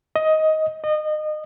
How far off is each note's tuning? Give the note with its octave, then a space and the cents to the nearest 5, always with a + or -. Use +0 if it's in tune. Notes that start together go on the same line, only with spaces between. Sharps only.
D#5 +15
D#5 -25